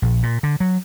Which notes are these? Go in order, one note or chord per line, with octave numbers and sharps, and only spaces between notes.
A#1
A#2
D3
F#3